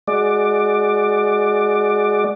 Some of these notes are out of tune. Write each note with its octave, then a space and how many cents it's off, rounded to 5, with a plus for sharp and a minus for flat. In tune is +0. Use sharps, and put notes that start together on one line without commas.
G#3 +10 F#4 +0 D5 +15